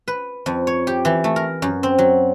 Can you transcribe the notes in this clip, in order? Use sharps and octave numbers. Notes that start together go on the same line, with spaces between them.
B4
F2
C#5
G4
E3
A3
A#4
F#2
C4
F#3